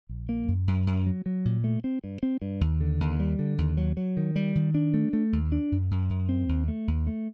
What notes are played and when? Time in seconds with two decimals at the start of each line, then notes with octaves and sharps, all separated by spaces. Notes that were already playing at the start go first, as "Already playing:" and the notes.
0.09 A#1
0.29 A#3
0.48 F#2
0.67 F#2
0.87 F#2
1.06 F#3
1.26 F#3
1.45 A#2
1.64 A3
1.84 C4
2.04 G2
2.23 C4
2.42 G2
2.61 D#2
2.81 D3
3.00 D#2
3.20 G3
3.39 D3
3.58 D#2
3.77 F#3
3.97 F#3
4.17 D#3
4.36 G3
4.55 D#3
4.74 D4
4.94 A3
5.13 A3
5.33 D#2
5.52 D4
5.72 F#2
5.91 F#2
6.10 F#2
6.29 C4
6.49 D#2
6.68 A3
6.88 D#2
7.07 A3